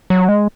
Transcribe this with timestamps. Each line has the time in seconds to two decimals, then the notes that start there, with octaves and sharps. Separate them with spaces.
0.10 F#3
0.28 G#3